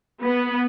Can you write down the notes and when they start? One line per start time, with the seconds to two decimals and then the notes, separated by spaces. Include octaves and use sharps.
0.22 B3